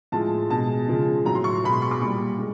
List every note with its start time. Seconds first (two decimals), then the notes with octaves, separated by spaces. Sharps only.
0.12 A2 F3 G#3 A5
0.50 B2 G#3 A5
0.88 C#3 F3 G#3
1.25 A2 F#3 A#5
1.35 C6
1.44 C#6
1.64 B2 G#3 B5
1.73 C6
1.82 C#6
1.91 D6
2.01 A#2 G3 C#6
2.38 G#3